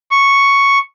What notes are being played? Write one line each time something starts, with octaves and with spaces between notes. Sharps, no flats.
C#6